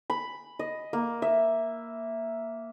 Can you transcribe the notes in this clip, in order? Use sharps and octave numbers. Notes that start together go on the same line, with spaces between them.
B5
D#5
A#3
E5